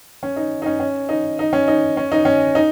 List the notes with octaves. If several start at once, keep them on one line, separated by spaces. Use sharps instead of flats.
C#4
D#4
D#4
C#4
C#4
D#4
D#4
C#4
D#4
C#4
D#4
C#4
D#4